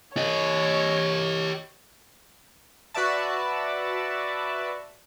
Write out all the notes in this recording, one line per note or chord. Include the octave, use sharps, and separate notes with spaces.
G4 C#5 D#5
F#4 B4 D5 E5 A5